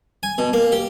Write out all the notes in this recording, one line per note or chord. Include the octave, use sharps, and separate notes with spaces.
G#5
B2
A#3
G4